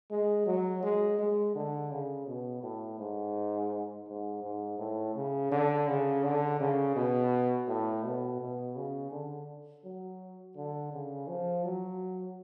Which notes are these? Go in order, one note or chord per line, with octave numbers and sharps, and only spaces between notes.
G#3
F#3
G#3
G#3
D3
C#3
B2
A2
G#2
G#2
G#2
A2
C#3
D3
C#3
D3
C#3
B2
A2
B2
B2
C#3
D3
F#3
D3
C#3
F3
F#3